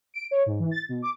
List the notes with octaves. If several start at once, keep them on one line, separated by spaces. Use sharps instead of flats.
D7
C#5
G#2
E3
A6
B2
D6